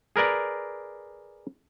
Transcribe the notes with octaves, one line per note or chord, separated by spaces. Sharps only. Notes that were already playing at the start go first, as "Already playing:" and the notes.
G#4 A#4 B4 D5 A#5